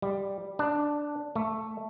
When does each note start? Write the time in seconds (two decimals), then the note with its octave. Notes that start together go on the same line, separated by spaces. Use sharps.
0.02 G3
0.59 D4
1.36 A3